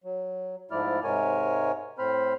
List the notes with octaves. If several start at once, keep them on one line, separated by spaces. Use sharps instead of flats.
F#3
G#2 F3 A3 E4 D5 F6
G#2 C3 G#3 A#4 C#5 G#5
A2 C4 C5 B5 F6